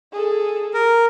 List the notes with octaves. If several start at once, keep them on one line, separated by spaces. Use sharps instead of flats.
G#4 A4
A#4